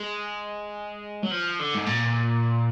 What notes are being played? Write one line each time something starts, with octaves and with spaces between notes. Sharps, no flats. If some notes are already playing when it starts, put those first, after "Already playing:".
Already playing: G#3
F#3
F3
D3
G#2
A#2